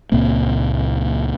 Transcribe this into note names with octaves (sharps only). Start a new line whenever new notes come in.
C#2 A#2 A#3 C4